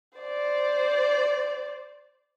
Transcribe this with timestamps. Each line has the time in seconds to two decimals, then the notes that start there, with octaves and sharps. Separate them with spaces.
0.19 C5 D5